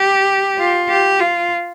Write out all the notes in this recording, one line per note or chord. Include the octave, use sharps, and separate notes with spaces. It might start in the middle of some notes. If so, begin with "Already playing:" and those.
Already playing: G4
F4
G4
F4